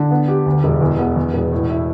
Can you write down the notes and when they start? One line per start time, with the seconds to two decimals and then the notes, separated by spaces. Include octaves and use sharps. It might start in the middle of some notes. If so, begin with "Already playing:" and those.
Already playing: D3
0.11 B3
0.28 G4
0.46 D2
0.64 E1
0.81 E2
0.99 B3
1.16 E2
1.33 E1
1.52 A2
1.70 E4